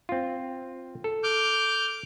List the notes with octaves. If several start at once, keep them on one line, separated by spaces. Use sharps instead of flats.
C4 F4
A4
D6 F6 G6